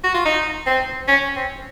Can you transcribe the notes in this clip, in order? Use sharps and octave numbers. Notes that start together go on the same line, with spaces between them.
F#4
F4
D#4
C4
C#4
C4